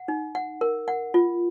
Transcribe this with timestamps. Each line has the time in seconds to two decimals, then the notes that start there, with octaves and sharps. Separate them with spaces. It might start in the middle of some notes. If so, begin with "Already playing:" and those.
Already playing: F#5
0.08 D#4
0.35 F#5
0.61 A#4
0.88 F#5
1.14 F4